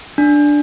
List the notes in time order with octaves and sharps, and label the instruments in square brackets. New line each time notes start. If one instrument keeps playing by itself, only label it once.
[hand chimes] D4